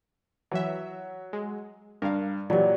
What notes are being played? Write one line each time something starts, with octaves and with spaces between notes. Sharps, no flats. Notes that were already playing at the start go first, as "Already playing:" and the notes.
E3 F#3 E5
G#3
G2 A#4 F5
A#2 E3 F#3 G4 D5